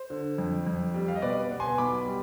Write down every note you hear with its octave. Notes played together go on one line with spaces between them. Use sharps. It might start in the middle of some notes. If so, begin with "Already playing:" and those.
Already playing: C5
D3
F2
F2
G3
F5
D#5
B2 B4 D5
B3
G#5 C6
B1 B5 D6
G3